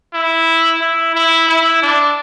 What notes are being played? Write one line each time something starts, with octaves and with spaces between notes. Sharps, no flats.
E4
E4
E4
E4
D4